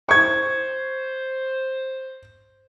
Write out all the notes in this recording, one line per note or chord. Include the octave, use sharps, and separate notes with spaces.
C5 C#6 G#6